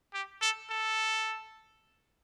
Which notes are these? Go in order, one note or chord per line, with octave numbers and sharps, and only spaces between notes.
G4
A4
A4